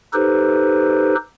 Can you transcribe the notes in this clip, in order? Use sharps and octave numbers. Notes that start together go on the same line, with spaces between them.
D#4 G4 A4 B4 C5